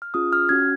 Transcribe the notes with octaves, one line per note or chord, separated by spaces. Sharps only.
F6
C#4 F4 G#4 D#6
F6
C#4 F#4 G#6